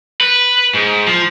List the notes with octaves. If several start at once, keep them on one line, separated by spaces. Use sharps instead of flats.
B4
G#2
F3